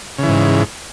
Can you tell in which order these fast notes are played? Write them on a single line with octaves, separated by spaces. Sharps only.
C#3 E3 G#2